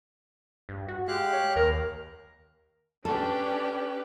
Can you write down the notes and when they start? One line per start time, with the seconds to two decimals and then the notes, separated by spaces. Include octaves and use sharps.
0.69 G2
0.88 F#4
1.08 G#3 G4 F5 F#6
1.33 C#5
1.56 D#2 A#4
3.05 C#4 D4 G4 A4 B4